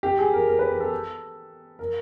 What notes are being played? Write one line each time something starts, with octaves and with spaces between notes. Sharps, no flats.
G4
G#4
A#4
A#4
B4
A#4
A4
A#4